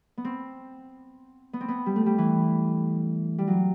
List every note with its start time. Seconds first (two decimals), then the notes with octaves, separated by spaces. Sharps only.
0.17 B3
0.25 C4
1.53 B3
1.61 C4
1.68 B3
1.86 G3
1.96 A3
2.06 G3
2.18 E3
3.38 G3
3.47 F#3